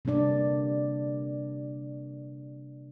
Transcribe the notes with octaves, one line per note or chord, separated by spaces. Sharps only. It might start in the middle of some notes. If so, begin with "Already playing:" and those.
C3 G3 A#3 D4 D5